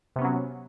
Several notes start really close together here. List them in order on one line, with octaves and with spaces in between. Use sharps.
C3 B3 C#4 F#3